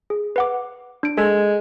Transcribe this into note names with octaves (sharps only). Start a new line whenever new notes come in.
G#4
B4 F#5 D6
D4 D7
G#3 A4